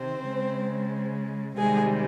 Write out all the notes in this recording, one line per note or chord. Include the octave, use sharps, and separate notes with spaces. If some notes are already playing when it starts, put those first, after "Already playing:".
Already playing: C3 D#3 C4 C5
C#3 G#3
C3 D#3 G3 G#3 G#4